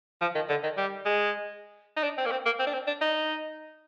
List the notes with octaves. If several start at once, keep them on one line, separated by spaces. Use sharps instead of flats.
F3
D#3
D3
D#3
G3
G#3
D#4
D4
C4
A#3
C4
A#3
C4
D4
C4
D4
D#4